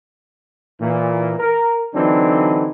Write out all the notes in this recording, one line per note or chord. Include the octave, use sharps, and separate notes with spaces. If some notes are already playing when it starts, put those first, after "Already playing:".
A#2 E3
A#4
D3 E3 F#3 C4 D4 D#4